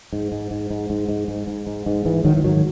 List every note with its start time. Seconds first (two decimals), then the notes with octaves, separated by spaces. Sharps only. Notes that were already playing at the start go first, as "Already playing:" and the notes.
0.13 G#2
0.32 G#2
0.51 G#2
0.70 G#2
0.90 G#2
1.09 G#2
1.28 G#2
1.47 G#2
1.67 G#2
1.86 G#2
2.05 G#2 E3
2.24 G#2 D#3 F#3
2.37 E3
2.43 G#2 D#3 F#3